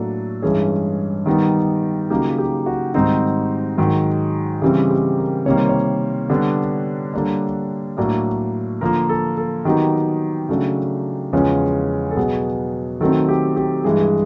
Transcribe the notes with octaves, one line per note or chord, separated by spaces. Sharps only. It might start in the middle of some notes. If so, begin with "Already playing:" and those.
Already playing: A2 F#3 A#3 D4 A4
G2 E3 G#3 C#4 G#4
D#3 G3 B3 D#4
C#3 F#3 A#3 D#4 G4
G4
F#4
G#2 D#3 G3 C4 D#4 F#4
G#2 D#3 F#3
C#3 E3 G3 C4 G4
G4
A#4
C3 D#3 G3 A#3 C#5
C5
C#5
D3 G3 B3 D4
D3 G3 A#3 D4
A2 F#3 A#3 D4 D5
D3 F3 A#3 A#4
A4
A4
D#3 F#3 B3 D#4 G4
C#3 F#3 A3 D4
E2 C#3 F3 G#3 C#4
A4
B2 F#3 B3 G#4
D#3 F#3 A3 C4 A4
G4
G4
G2 E3 G#3 G#4